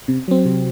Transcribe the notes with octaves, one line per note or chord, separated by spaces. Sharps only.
C3
F#3 C4
C3